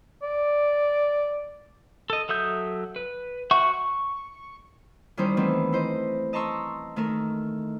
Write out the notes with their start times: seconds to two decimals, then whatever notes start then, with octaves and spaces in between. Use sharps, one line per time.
0.22 D5
2.10 A4 D#5
2.29 F#3 A4 E5 D#6 G6
2.96 B4
3.51 F#4 C5 E5 F#5 C#6
3.74 C#6
5.17 D#3 G3 C#4 D#4 E4 C5
5.37 D#3 E3 A3 B3 C4
5.73 E4 C5 D#5
6.33 D#5 A5 A#5 C6 C#6 E6
6.96 D#3 A3 A4 A#4